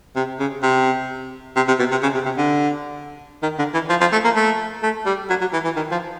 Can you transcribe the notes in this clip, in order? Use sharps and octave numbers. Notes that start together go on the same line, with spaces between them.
C3
C#3
C3
C3
C3
B2
C3
C#3
C3
C3
D3
D#3
D3
E3
F3
F3
A3
A#3
A3
A3
G3
F#3
F#3
E3
E3
D#3
F3